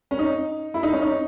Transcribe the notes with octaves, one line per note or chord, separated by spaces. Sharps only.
C#4
D#4
E4
D#4
C#4
D#4